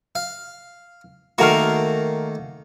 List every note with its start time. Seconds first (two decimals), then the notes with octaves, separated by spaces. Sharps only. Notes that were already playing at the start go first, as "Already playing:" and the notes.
0.15 F5
1.38 D#3 A3 A#3 F#4 A#4 F5